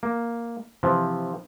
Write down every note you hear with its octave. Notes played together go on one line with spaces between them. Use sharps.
A#3
C3 E3 F3